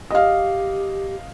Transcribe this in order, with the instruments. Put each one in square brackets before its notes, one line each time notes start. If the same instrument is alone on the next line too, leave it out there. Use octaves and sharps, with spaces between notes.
[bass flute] G4 [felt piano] D#5 F5